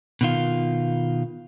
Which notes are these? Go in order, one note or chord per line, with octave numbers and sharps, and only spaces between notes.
B2 D#3 F4